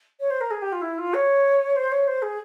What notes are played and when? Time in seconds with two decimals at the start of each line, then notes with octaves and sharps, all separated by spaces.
0.20 C#5
0.30 C5
0.41 A#4
0.51 G#4
0.62 G4
0.72 F4
0.82 E4
0.98 F4
1.14 C#5
1.76 C5
1.92 C#5
2.08 C5
2.22 G#4